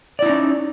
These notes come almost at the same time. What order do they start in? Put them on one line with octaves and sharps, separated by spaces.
D5 E4 D#4 C#4